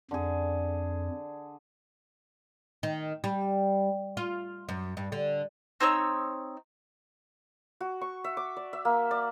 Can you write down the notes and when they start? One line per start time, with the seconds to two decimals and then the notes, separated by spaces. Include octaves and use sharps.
0.11 F2 D3 G#4
2.83 D#3
3.24 G3
4.17 F4
4.69 F#2
4.97 G2
5.12 D3
5.80 C4 D#4 C#5 E6
7.81 F#4
8.01 C#6
8.24 E5
8.37 D6
8.57 D5
8.73 E5
8.85 A#3
9.11 D5